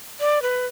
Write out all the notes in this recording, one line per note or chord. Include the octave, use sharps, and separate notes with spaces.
D5
B4